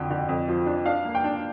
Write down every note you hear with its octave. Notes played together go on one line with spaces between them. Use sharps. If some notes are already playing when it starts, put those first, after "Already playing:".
Already playing: F2 D3 G5
D3
F2
F3
D4
D4 F5
A#3
G5
D4